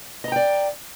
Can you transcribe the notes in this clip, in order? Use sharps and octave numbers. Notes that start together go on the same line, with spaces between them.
D5 D#5 G5 A#5